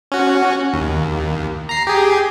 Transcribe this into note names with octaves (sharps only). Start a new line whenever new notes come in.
C#4 F#4
D#2
A#5 C7
G4 G#4